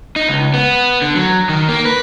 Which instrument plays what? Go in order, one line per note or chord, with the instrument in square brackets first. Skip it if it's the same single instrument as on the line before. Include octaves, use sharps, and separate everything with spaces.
[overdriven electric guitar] D#4
C#2
B3
D3
F#3
D#3
A#3
B4